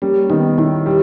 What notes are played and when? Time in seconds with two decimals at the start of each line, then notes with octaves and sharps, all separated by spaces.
0.02 G3 A#3 C#4
0.30 D#3 B3 D#4
0.58 D#3 C#4 E4
0.86 G3